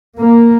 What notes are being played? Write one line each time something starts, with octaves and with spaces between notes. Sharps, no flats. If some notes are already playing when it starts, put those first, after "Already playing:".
A#3